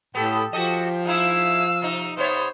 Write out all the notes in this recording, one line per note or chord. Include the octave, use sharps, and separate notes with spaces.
A2 B3 G4 A4
F3 F#4 G4 A4 D#5
G#3 D#4 E4 F5 E6
C3 D#4
C3 B3 C5 C#5